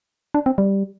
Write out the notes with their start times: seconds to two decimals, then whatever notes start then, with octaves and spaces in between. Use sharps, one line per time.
0.34 D4
0.46 C4
0.58 G3